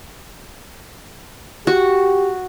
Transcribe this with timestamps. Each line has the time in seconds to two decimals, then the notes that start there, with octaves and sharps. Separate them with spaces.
1.67 F#4 G4